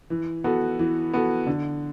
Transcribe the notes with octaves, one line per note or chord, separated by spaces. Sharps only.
E3
B3 F#4 A4
E3
B3 F#4 A4
D3